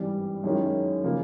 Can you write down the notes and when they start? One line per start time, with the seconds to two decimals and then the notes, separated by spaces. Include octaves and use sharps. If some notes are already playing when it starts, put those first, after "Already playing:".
Already playing: G#1 G2 E3 G3
0.44 F#2 D#3 G#3 C#4 E4
1.04 C#3 F3 A#3